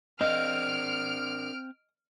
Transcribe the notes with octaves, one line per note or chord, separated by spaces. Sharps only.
C4 D4 A#4 D5 D#5 F5 F6 D7